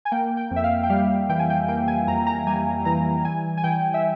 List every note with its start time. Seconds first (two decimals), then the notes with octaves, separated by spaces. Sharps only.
0.05 G#5
0.12 A#3 G5
0.37 G5
0.51 F2
0.56 E5
0.64 F5
0.83 G5
0.90 G3 F5
1.29 E3 G5
1.39 G#5
1.50 G5
1.68 A#3 G5
1.88 G#5
2.07 F2 A#5
2.27 A#5
2.47 G3 G#5
2.85 E3 A#5
3.25 E3 G#5
3.58 G#5
3.64 E3 G5
3.94 E5